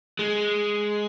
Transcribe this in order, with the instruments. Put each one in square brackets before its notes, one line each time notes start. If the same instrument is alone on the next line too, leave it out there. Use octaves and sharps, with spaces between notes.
[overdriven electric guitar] G#3